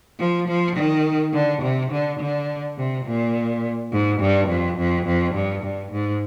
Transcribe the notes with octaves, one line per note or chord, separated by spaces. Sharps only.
F3
F3
D#3
D3
C3
D3
D3
C3
A#2
G#2
G2
F2
F2
F2
G2
G2
G#2